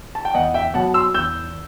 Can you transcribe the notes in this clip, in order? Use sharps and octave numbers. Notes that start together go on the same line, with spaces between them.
A5
G5
E2 D#5 F#5
E5 G5
B2 F#3 F#5 A5
C6 E6
E2 E6 G6